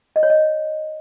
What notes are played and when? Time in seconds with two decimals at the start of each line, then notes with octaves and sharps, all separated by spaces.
0.16 D#5
0.23 C#5
0.30 D#5